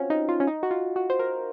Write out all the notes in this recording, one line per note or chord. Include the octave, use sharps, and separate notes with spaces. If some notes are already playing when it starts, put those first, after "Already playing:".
Already playing: C4 C#4 F4 F#4
D#4
F4
C#4
D#4
F#4
F4
F#4
C5
A#4